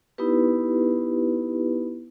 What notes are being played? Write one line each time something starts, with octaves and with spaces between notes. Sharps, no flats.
B3 D#4 E4 G4 B4